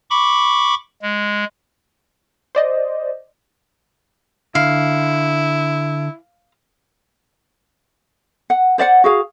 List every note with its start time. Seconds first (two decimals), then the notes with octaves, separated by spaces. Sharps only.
0.10 B5 C#6 D6
1.02 G#3
2.55 C5 D5 D#5
4.55 D3 E4 F5
8.50 F#5
8.78 C5 D5 E5 F#5
9.04 F#4 G#4 F5